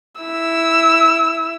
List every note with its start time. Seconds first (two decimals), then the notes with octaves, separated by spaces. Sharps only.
0.20 E4 E6